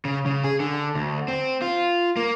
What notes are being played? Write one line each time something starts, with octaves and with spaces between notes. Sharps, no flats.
C#3
C#3
G#4
D3
D2
C4
F4
A#3